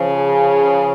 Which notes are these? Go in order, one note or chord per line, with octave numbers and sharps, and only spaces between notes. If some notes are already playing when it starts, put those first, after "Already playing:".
Already playing: C#3 F3
G#4